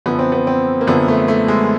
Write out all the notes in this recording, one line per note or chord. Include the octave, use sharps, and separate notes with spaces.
F#2 D3 F3 B3
C4
B3
C4
A#3
F#2 D3 F3 B3
A3
A3
G#3